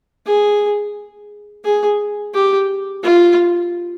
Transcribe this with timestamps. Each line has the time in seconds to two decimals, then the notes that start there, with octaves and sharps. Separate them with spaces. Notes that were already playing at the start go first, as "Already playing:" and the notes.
0.26 G#4
1.64 G#4
2.34 G4
3.03 F4